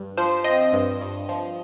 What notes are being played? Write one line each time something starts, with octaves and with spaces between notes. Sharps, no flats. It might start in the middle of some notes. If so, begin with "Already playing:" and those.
Already playing: G2
F3 C5
C4 D#5
G2
G2
F3